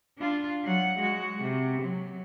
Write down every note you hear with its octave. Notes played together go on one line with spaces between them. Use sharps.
D4 F4
F#3 F#5
G#3 F#4
C3
F#3